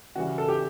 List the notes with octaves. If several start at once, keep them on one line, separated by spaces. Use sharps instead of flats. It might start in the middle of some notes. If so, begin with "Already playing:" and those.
C#3 E3 G3 F#4
A4
G4